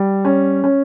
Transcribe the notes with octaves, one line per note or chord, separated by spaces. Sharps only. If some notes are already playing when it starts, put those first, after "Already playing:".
Already playing: G3
C#4
C#4